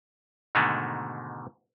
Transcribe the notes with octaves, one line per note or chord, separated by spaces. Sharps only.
G#2 B2 D3 D#3 G#3 A3